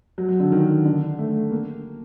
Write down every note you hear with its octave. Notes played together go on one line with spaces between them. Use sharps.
F#3
F#3
D3
D#3
D3
A3
A#3